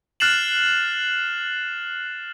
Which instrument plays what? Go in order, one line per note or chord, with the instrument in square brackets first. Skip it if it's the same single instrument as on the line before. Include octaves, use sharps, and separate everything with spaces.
[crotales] F6 F#6 A6 C7 E7 F#7